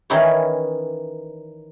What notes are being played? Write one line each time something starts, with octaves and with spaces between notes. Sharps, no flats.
D#3 E3 C#4 D#4 E4 C#5